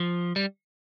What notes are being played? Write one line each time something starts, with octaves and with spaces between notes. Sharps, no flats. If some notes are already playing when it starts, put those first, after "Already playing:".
Already playing: F3
G3